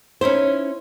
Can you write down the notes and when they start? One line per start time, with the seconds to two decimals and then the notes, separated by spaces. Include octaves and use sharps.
0.21 C#4 D#4 E4 C5